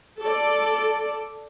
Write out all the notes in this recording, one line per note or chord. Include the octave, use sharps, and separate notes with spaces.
A4 D5